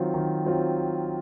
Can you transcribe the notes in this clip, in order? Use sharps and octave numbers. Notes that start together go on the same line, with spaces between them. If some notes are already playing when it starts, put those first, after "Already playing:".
Already playing: D#3 F#3 C4 F4
D#3
F#3 C4 F4